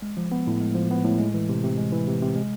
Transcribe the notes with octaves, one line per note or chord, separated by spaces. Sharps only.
G#3
F3
B3
A2
G#3
F3
B3
A2
G#3
E3
C3
C3
G#3
E3
C3
C3
G#3